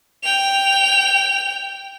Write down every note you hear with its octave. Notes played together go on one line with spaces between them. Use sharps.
G5 F7